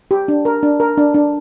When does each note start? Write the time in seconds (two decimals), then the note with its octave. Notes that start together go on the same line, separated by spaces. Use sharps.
0.11 G4
0.28 D4
0.45 A#4
0.63 D4
0.80 A#4
0.97 D4
1.14 D4